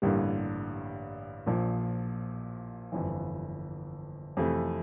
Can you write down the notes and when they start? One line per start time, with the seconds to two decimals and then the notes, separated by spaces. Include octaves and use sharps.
0.02 A1 G2 D3 G3 A#3
1.46 A#1 A#2 F3
2.92 G1 F2 E3
4.37 F2 C3 E3 A3